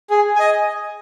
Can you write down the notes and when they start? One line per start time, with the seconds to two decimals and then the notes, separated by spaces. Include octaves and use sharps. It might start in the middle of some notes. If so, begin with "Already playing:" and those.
0.10 G#4
0.36 D#5 G#5